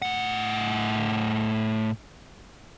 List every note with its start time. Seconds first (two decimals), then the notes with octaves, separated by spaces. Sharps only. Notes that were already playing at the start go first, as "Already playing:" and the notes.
0.02 A2 F#5